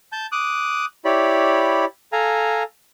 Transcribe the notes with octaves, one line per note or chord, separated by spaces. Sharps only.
A5 G6
D6 D#6 F#6
E4 G4 C#5 D5 B5
A4 F5 G#5 A#5